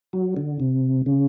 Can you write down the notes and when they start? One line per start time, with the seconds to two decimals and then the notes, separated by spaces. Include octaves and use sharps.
0.13 F#3
0.37 D3
0.60 C3
1.06 C#3